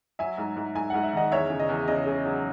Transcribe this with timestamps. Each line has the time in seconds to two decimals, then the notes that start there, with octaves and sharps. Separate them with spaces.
0.19 F#3 E5 G#5
0.38 G#2
0.57 G#2
0.75 G#2 G#5
0.90 G#2 F#5
1.03 E5
1.13 D#3 D#5 F#5
1.32 E2 C#5 E5
1.50 C#3
1.60 D#5
1.69 E2
1.88 C#3 D#5
2.06 C#3
2.25 F#3